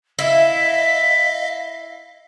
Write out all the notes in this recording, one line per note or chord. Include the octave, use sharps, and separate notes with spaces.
E4 D#5 F5 B6